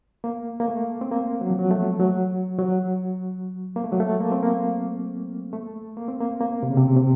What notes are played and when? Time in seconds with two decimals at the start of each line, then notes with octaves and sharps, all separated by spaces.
0.24 A#3
0.60 A#3
0.68 A3
1.01 C4
1.12 A#3
1.41 F#3
1.50 F3
1.59 F#3
1.71 A3
1.99 F#3
2.59 F#3
3.76 A#3
3.84 A3
3.92 F#3
4.00 A3
4.20 A#3
4.32 C4
4.43 A#3
5.53 A3
5.97 A#3
6.08 C4
6.20 A#3
6.41 A#3
6.63 C3
6.70 C#3
6.77 C3
6.97 C3